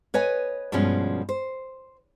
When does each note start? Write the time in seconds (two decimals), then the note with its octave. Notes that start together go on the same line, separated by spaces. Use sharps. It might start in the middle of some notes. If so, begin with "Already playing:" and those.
0.14 B4 C#5 D#5 G#5
0.72 G2 B2 F3 G#3 C#4
1.29 C5